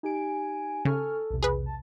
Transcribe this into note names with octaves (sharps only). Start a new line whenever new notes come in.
D#4 G4 G#5 D7
C#3 A4 G#5 C#6 F6
B1 E2 C3
G#4 B4
A5